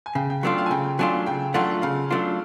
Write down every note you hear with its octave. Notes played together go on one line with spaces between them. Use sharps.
G#5
C#3 G5
G5
F#3 A3 D4 F4 G5
F5
G#5
C#3 G5
F#3 A3 D4 F4 G#5
C#3 G5
F#3 A3 D4 F4 F#5
C#3 F5
F#3 A3 D4 F4